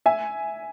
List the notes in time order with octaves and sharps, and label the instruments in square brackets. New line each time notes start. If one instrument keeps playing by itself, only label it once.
[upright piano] E5 G#5